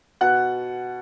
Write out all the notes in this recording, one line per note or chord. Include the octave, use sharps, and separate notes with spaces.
B2 F#5 F#6